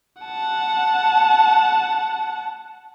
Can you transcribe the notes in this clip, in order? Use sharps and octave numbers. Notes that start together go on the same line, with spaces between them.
F#5 A5